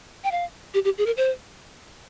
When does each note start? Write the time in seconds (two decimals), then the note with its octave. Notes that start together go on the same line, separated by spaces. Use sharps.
0.24 G5
0.31 F5
0.74 G4
0.85 G4
0.98 G#4
1.06 A#4
1.17 C5